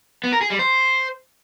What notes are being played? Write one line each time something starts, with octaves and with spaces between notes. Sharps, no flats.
B3
A#4
G#4
G3
C5